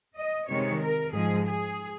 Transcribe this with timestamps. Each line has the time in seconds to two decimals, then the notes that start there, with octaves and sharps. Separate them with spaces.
0.17 D#5
0.48 C3 D#3 G#3 C#5
0.81 A#4
1.13 G#2 F3 G#3 G#4
1.45 G#4